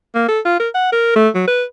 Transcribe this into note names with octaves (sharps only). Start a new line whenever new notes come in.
A#3
A4
F4
A#4
F#5
A#4
A3
F#3
B4